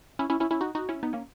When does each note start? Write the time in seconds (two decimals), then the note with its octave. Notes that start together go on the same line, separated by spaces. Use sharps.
0.19 C#4 E4
0.30 C#4 E4
0.40 C#4 E4
0.51 C#4 E4
0.61 D#4 F#4
0.75 D#4 F#4
0.89 C#4 E4
1.03 B3 D#4
1.13 A#3 C#4